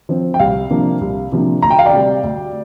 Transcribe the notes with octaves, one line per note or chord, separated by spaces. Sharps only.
F3 C4
G5
C2 F5
C3 F3 A#3 D4
C2
C3 F3 A#3 D4
D2 A#5
G5
F5
D5 G5
C3 G3
D2